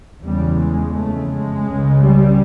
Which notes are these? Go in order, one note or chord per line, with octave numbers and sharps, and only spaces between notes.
E2 C#3 G3
G#3
F2 C#3 A3
G#3
C#2 C#3
G3